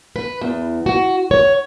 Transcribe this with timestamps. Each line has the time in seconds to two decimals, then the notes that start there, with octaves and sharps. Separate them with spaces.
0.16 B4
0.41 E2
0.86 F#4
1.31 C#5